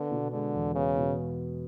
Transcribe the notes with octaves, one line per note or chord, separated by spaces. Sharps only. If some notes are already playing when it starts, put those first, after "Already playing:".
Already playing: D3 B3
B2
D3 G#3
E2
C#3 B3
B2